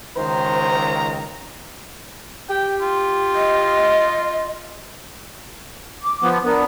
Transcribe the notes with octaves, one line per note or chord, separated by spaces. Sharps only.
C#2 D#3 C5 A#5
G4 G5
F4
D#5
D6
F3 B3
B3 D4 A#4